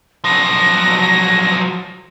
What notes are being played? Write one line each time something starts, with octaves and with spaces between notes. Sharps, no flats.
F3 F#3 A#6